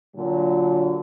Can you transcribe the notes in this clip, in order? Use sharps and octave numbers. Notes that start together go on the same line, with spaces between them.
A#2 D3 F#3